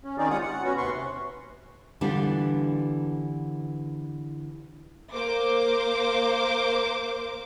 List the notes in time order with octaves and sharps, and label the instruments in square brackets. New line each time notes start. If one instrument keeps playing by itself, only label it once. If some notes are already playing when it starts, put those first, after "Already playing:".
[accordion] C#4
D#3 C4 C#4 D#4 G#4 D5
G3 G#3 F4 F#5 D#6
F#5
B3 C#4 F#4
D#2 C3 B4 C6 C#6
[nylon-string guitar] D3 E3 G3 B3 D4 F4
[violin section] A#3 C5 D6